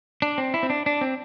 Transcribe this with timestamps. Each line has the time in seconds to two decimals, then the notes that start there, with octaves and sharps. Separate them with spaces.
0.22 D4
0.38 C4
0.54 E4
0.63 C4
0.70 D4
0.86 D4
1.01 C4